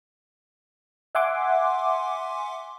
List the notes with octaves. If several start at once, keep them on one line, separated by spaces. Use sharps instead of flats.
E5 F#5 G#5 C6 D6